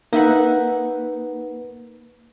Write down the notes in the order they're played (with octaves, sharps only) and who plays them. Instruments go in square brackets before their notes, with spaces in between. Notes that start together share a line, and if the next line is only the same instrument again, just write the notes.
[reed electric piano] A#3 B4 [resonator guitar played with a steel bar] D#4 E5 F#5